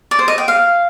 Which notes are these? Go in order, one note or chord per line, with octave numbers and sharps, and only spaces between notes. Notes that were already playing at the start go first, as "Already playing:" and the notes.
D5
C5
D#5
G5
F5